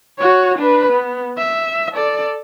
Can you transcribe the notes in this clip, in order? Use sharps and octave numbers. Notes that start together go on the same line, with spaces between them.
F#4 C#5
D4 B4
B3
E5
A4 D5